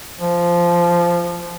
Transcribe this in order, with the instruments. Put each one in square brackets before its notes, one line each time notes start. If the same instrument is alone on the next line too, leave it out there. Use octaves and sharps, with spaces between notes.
[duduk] F3